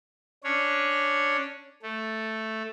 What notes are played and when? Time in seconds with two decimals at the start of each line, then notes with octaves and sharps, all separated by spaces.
0.44 C#4 D4 C#5
1.82 A3